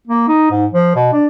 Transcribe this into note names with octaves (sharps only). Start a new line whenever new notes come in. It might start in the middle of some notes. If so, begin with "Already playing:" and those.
A#3
D#4
G#2
F3
B2
D4